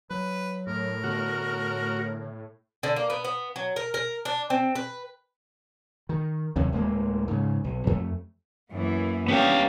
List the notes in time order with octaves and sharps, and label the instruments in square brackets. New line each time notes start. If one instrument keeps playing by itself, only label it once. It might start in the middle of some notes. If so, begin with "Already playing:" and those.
[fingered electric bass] F#3 [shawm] B4
[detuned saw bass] A2 [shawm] A#4
[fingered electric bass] D3 B3 [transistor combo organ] F#4
[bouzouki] D3
A#3
B3
B3
F#3
A#4
A#4
D4
C4
B4
[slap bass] D#3
D#2 C3 F#3
D1 G#3 A#3
G#2 C#3
B1
F2 A3
[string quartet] F#2 [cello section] E3 A#3 B3
[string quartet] G3 C#4 G4 [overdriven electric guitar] B3 F5 [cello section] D4